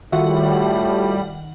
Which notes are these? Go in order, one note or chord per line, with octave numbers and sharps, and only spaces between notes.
A2 D#3 G3 F4 F#4 E5 F#5